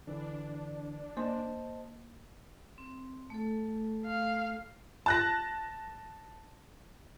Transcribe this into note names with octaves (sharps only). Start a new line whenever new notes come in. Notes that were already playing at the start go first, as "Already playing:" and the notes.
D3 E3 D4
A#3 C5 D#5 A5 C6
C4
A3 A4
F5
A5 F#6 A#6